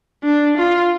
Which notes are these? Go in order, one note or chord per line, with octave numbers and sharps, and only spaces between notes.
D4
F4